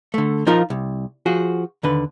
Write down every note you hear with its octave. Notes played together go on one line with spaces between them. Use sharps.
D3 A3
F3 D#4 F4 A#4
C2
F3 F#4 G#4
D#2 D3 B4